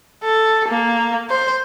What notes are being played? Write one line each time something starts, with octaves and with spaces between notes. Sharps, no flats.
A4
A#3
C5